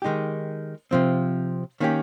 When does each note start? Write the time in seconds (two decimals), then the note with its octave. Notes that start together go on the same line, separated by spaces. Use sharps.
0.02 D#3 G#3 D#4 G4
0.91 C3 F3 C4
1.80 D#3 A#3 C#4 G4